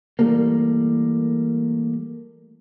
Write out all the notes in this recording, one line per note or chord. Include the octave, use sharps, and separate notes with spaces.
E3 G3 A3 A#3